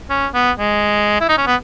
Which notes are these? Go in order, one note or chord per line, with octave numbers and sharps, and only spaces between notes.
C#4
B3
G#3
E4
D#4
C#4
B3